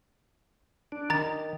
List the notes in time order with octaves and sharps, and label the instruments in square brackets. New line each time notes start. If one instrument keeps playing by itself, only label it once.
[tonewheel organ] D4
[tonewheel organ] D#3 [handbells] A#5 A6